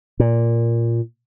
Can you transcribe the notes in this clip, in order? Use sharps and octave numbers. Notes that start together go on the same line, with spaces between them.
A#2